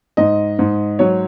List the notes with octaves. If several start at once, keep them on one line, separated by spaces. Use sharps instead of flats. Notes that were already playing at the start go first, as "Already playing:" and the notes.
G#2 D#5
G#2
F#3 C#5